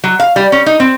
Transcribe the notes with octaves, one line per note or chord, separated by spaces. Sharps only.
F#3
F5
G3
C#4
D#4
C4